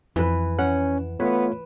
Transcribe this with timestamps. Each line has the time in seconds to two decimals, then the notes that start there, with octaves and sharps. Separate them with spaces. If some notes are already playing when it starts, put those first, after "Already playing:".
0.16 F2 E3 B4
0.59 C#4 F#5
1.20 A3 B3 F4 B4 C#5